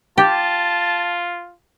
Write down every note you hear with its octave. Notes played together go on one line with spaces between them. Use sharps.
F4 G4 A5